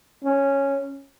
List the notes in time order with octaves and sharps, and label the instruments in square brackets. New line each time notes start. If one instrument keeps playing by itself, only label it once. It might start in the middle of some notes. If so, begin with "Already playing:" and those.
[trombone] C#4